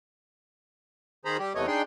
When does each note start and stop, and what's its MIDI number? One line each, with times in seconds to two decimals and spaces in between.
1.25 1.37 51
1.25 1.37 68
1.25 1.37 72
1.25 1.37 82
1.25 1.37 83
1.39 1.53 55
1.39 1.53 67
1.55 1.66 40
1.55 1.66 48
1.55 1.66 57
1.55 1.66 59
1.55 1.66 73
1.55 1.66 75
1.67 1.82 62
1.67 1.82 63
1.67 1.82 68
1.67 1.82 79
1.67 1.82 84